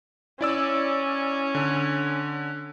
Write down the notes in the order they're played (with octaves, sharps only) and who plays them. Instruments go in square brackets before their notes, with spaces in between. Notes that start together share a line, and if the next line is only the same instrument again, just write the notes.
[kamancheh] C#4 [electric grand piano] E4 D5 E6
[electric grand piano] D3